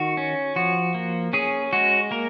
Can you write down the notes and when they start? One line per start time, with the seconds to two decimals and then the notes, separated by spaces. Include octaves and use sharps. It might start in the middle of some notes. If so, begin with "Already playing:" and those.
Already playing: D#3 F#4
0.17 C#4
0.56 F3 F#4
0.94 A#3
1.33 C#4 G#4
1.73 G#3 F#4
2.11 A#3 A#4